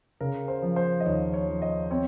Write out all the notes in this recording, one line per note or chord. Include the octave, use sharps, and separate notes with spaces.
C#3 A#4
C5
F3
C5
D#5
D#2 C#5
C#5
F3
D#5
C4 C#5